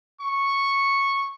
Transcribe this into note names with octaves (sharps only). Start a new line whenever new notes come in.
C#6